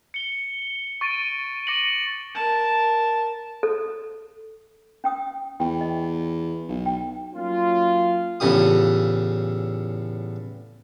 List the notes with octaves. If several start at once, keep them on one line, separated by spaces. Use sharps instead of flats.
C#7 G7
C#6 A6 D7 D#7
D6 A#6 C#7 F#7
A#4 A5
A4
C#4 G5 D#6
E2 G5
D#5
B1
G5
F#3 A#3 C#4 F4
E2 A2 C#3 F4 G4 D#6